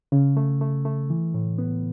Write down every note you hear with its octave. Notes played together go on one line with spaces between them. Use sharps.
C#3
A3
A3
A3
E3
A2
B3